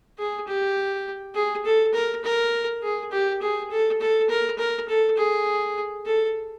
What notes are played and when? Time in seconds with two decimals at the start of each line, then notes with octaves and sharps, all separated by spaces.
0.18 G#4
0.47 G4
1.35 G#4
1.65 A4
1.94 A#4
2.24 A#4
2.83 G#4
3.11 G4
3.41 G#4
3.70 A4
4.01 A4
4.29 A#4
4.58 A#4
4.89 A4
5.17 G#4
6.06 A4